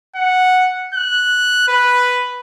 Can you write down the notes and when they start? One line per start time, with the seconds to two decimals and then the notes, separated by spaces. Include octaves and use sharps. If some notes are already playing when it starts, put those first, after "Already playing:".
0.16 F#5
0.94 F#6
1.68 B4